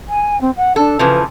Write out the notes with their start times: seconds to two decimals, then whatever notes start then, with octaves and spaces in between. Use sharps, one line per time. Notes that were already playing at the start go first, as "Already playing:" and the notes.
0.08 G#5
0.40 C4
0.56 F#5
0.76 D4 A4
0.99 C#3 E3 F3 B4